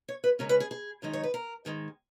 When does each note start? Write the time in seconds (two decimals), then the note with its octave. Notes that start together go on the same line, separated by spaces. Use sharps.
0.08 C#5
0.24 B4
0.39 C#3 G#3 C#4 A#4
0.49 B4
0.60 G#4
0.71 G#4
1.02 F#2 D#3 G#3 D#4
1.13 C#5
1.23 B4
1.34 A#4
1.65 G#2 D#3 G#3